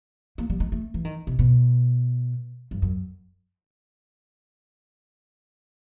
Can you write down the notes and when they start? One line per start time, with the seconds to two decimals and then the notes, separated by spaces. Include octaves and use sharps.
0.38 A#3
0.50 G3
0.60 G#3
0.72 A3
0.94 E3
1.05 D#3
1.27 C3
1.39 B2
2.71 G2
2.82 F#2